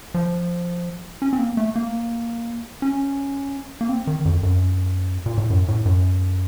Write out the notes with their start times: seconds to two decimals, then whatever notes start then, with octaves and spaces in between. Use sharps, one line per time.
0.14 F3
1.22 C#4
1.33 C4
1.39 A#3
1.57 A3
1.76 A#3
2.82 C#4
3.81 A#3
3.89 C4
4.07 D#3
4.25 F2
4.43 F#2
5.26 A#2
5.38 A2
5.50 F#2
5.68 A2
5.86 F#2